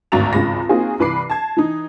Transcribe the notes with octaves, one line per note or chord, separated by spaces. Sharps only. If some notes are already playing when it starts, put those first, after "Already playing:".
G#1 D2 F#4 A#5 A6 F7
G#1 C#2 G#3 B5 A#6
A#3 C4 D#4 F4 F#4 G#4
C2 E3 B4 B5 D6 C7
A5 G#6
E3 D#4